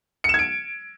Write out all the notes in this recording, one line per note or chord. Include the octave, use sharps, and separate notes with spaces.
G#6 C#7 D7 E7